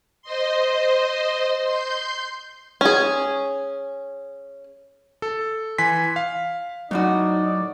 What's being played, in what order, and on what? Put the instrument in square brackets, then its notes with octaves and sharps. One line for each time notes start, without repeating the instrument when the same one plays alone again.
[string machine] C5 D#5 C6
C6 G6
[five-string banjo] C#4 G#4
[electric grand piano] A4
E3 G#5 C6 B6
F5
[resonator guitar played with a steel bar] F#2 A2 F#4 [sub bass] F#3 [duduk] D#4 [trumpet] D5